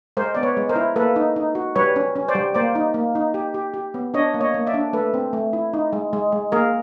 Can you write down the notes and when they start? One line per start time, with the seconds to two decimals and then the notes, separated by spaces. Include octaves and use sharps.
0.17 G#3 A#4 C5
0.35 B3 D5
0.43 B4 C#5
0.57 G#3
0.69 A#4 C5
0.76 E4
0.96 A#3 A4 B4
1.16 D#4
1.36 D#4
1.55 F#4
1.76 G3 B4 C#5
1.96 C#4
2.16 C#4
2.28 C5 D5
2.35 G3
2.55 A#3 C5 D5
2.75 D#4
2.94 A#3
3.15 D#4
3.34 G4
3.54 G4
3.74 G4
3.94 B3
4.14 D4 C#5 D#5
4.34 A#3
4.40 C#5 D#5
4.54 A#3
4.67 D5 E5
4.74 D4
4.93 A3 A4 B4
5.14 C4
5.33 A3
5.53 E4
5.73 D#4
5.93 G#3
6.13 G#3
6.32 G#3
6.52 A#3 G#4 A#4